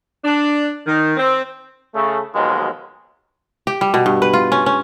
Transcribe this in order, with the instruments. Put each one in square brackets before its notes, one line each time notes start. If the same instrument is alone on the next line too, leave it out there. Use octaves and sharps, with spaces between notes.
[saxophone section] D4
D#3
C4
[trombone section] C#3 A3
D#2 B2 F3 F#3 G#3
[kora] G4
G3
B2
G2
B4
F4
C#4
C#4